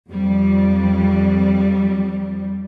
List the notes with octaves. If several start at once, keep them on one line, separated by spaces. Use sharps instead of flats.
F2 G3